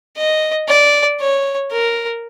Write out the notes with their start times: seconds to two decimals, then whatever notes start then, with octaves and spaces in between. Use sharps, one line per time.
0.17 D#5
0.68 D5
1.20 C#5
1.71 A#4